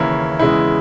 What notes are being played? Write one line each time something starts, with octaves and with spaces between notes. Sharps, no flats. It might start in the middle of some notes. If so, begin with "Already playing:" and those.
Already playing: D#2 C#3 E3 A#3 C#4 E4
E2 C#3 G#3 E4